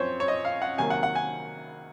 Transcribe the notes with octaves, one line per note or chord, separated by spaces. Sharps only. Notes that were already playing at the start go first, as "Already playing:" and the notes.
Already playing: F#2 F3 C4 C5 C#5
C#5
D#5
F5
F#5
C3 D#3 F#3 A#3 G#5
F#5
F#5
G#5